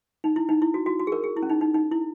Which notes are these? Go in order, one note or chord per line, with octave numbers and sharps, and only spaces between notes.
D#4
E4
D#4
E4
F#4
F#4
F#4
G#4
A#4
G#4
E4
C#4
D#4
D#4
D#4
E4